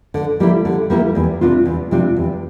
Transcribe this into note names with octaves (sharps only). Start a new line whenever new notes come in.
D3
G3 A#3 E4
D3
G3 A#3 E4
E2
C3 G3 D4 F4
E2
C3 G3 D4 F4
E2